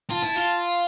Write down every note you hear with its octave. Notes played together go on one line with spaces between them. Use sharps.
F4 A5
E4
F4